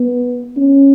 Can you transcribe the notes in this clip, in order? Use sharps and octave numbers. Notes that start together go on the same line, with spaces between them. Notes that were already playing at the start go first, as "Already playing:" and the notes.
Already playing: B3
C#4